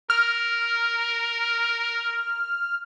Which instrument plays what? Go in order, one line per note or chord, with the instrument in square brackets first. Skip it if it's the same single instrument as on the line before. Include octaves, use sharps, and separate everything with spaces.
[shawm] A#4 [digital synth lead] F6